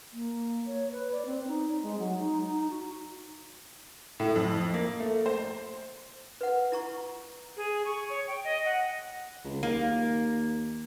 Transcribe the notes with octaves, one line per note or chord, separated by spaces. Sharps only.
A#3
C#5
B4
D5
C4
D#4
G#3
F#3
D#4
D#4
F#4
A2
F2
A#3
A3
C5
B4 F#5
E4 A#5 C#6
G#4
C#6
C#5
G5
D#5
F#5
C#2
D#2 A#3